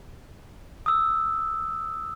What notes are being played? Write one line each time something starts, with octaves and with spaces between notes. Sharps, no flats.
D#6 E6